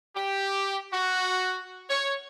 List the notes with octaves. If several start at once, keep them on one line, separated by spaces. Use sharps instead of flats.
G4
F#4
C#5